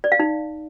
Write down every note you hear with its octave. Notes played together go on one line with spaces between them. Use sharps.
D5
F5
D#4